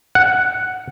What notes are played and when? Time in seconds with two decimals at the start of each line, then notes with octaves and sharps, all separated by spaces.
0.15 F#5